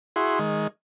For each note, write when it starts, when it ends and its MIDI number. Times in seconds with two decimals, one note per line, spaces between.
0.16 0.39 64
0.16 0.39 66
0.16 0.39 68
0.16 0.39 84
0.39 0.67 51
0.39 0.67 56